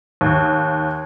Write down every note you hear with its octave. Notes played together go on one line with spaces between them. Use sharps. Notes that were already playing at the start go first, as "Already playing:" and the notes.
D#2